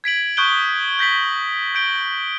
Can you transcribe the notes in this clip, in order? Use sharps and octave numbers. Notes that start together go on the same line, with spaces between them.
G#6 B6 D7 F#7
C#6 D#6 F#6 G6 D7 G7
G6 A#6 B6 F#7
G6 D7 G7